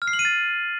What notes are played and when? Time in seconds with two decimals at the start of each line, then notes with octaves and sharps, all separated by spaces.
0.02 F6
0.08 C7
0.13 F#7
0.19 D#7
0.25 A6